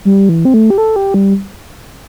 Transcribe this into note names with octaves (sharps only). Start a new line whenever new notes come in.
G3
E3
C4
A3
G4
A4
G4
G3